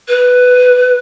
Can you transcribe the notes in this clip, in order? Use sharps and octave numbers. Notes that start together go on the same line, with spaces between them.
B4